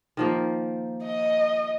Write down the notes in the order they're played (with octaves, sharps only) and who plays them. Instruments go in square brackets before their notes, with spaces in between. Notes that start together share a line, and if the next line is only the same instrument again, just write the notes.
[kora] D#3 F3 A#3
[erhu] D#5